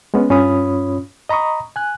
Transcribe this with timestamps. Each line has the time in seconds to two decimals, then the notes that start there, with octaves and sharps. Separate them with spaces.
0.14 G#3 B3 C#4
0.30 G2 C#4 F4 C#5 B5 D#6
1.29 D#5 A#5 B5 C#6 D#6
1.76 G#5 F#6